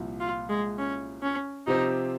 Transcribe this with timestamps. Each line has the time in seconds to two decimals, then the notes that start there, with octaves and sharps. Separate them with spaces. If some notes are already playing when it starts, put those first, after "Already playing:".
Already playing: C2 A#2 F3
0.20 F4
0.50 G#3
0.78 C#4
1.23 C#4
1.67 C3 F3 C4 D#4 G4 C5